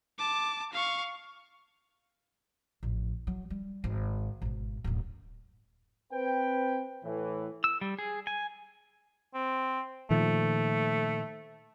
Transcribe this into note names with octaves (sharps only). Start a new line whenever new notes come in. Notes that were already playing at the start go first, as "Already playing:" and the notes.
A5 D6
F5 C#6
A1 F2
F#3
G3
G#1
G#1 B2
D1 F#2
C4 B4 G5
A2 E3
E6
G3
G#4
G#5
C4
A#2 D#3 F3 A3